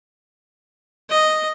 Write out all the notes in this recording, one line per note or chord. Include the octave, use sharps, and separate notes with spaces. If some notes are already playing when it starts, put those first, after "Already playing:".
D#5